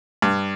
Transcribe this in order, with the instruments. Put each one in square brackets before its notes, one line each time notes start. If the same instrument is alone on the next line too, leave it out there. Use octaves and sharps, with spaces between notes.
[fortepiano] G2